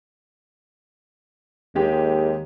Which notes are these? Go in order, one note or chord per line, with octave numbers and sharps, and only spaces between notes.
D#2 G#3 G4